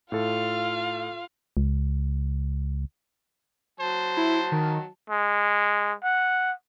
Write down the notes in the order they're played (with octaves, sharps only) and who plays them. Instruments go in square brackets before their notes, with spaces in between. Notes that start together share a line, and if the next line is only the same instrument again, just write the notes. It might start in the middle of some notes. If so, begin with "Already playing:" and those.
[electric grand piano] A2 A4 [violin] F4 F5
[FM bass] C#2
[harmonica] F#3 A5 [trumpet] C5
[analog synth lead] E4
D#3
[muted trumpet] G#3
F#5